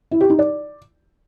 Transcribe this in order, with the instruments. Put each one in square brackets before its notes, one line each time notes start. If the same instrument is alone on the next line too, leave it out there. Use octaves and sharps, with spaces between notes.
[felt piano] E4
G4
D#4
D5